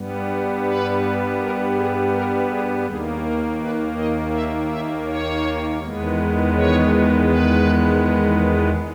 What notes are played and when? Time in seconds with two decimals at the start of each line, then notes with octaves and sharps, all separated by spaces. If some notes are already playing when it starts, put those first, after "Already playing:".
Already playing: G2 G3 B3
0.65 B4
1.39 A#4
1.76 G#4
2.13 A#4
2.49 G#4
2.86 D#2 D#3 A#3 G#4
3.22 A#4
3.60 B4
3.96 D#5
4.33 E5
4.69 E5
5.06 C#5
5.80 E2 D#3 G#3 B3
6.54 C#5
7.27 B4